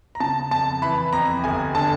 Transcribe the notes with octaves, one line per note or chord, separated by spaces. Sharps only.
A#5
C#3 A5
F2 A5
E3 B5
F2 A#5
G1 G#5
D3 A5